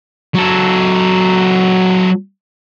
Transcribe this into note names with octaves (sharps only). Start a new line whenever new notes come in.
F#3 A4